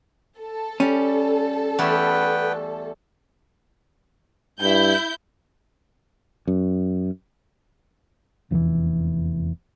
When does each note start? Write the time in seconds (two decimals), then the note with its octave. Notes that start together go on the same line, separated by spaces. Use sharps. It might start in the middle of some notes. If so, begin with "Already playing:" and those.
0.39 A4
0.80 G3 C#4
1.79 E2 G3 A3 B3 B4 G5
4.60 G2 E4 G6
6.48 F#2
8.51 F1 E2 G2 E3